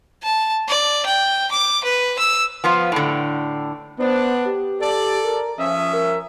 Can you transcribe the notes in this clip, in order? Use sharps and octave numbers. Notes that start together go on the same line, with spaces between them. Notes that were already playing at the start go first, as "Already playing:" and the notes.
A5
D5
G5
D6
B4
E6
F3 B3 F4
A2 D3
B3 D4 C5
G4
A4 D5
A#4
F3 C#4 E5 D#6
A#4